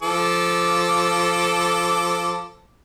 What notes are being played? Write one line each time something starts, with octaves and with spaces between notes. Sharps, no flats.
F3 A4 D6